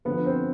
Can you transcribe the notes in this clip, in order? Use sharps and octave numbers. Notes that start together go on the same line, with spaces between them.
D2 D3 F3 B3 B4
C4 C5